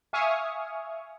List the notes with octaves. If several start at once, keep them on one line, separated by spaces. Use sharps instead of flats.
E5 F5 G#5 C#6 D#6 F6